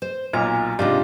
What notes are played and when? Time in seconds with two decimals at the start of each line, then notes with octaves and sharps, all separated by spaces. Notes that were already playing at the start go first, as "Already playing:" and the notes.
0.02 C5
0.33 B1 A#2 A#5
0.79 G#2 C3 D4 D#4 F4 G4